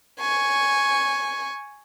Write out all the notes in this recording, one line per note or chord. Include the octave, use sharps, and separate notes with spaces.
G#5 C#6